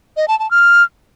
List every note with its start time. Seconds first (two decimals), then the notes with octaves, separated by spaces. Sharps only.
0.17 D#5
0.28 A5
0.39 A5
0.51 F6